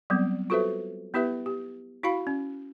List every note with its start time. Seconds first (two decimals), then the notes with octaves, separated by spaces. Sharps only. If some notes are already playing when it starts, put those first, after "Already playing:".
0.10 F#3 G3 B3 C4
0.50 F4 F#4 A4 B4 C5 E5
1.14 B3 E4 G4 B4 E5
1.46 G4
2.03 E4 F#4 F5 B5
2.27 C#4